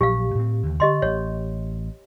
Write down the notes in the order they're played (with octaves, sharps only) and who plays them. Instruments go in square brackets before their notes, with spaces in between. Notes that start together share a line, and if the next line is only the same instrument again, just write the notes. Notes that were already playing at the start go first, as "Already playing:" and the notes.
[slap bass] A#1 A#2 F#3 [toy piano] G4 F5
[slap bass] A2 C4
D#2 D3
[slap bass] D3 [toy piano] G4 D#5 C6
[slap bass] A1 [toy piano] C#5